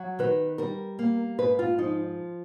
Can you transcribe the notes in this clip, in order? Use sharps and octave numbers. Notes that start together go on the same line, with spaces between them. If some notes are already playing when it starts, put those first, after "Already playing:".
Already playing: F#3
D#3 B4
G3 A#4
A#3
G#2 B4
F4
F3 D#4